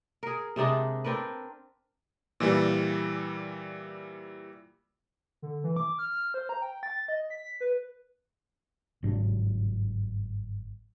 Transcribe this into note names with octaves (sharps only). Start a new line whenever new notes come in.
G#4 A#4
C3 G#3 D4 D#4
C4 D4 A#4 B4
A#2 E3 G3
D3
E3
D6
F6
C5
A#5
G5
A6
D#5
B6
B4
G1 G#2 F#3 D4